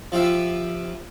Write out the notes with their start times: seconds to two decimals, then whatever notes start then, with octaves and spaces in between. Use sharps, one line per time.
0.12 F3 F4 G4 E5